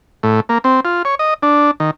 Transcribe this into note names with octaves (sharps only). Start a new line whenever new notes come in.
A2
A#3
C4
F4
C#5
D#5
D4
D#3